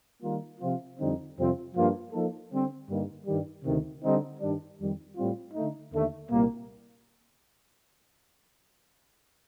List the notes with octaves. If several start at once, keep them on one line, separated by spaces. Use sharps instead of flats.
D#3 G3 A#3 F4 A#4
C3 F3 C4 F4
F2 D3 G3 C4 D#4
F2 C3 G3 C4 F4
G2 F3 A#3 F4
F3 A#3 D#4 A4
D3 G3 C4
G2 D3 G3 A#3 D#4
G2 D#3 G3
D2 C3 D#3
D3 G3 C4 D#4
G2 D#3 G3 D4
F2 D#3 G3
A2 G3 C4 F4
D3 A3 D#4
D#2 D3 A3
C2 A#2 G3 A#3